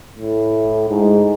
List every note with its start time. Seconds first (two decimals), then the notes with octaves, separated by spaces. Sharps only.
0.18 A2
0.89 G#2